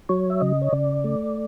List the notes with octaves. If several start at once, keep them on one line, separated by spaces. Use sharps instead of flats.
F#3 C#5
E5
C#3 D#5
C#5
C#3 D5
A3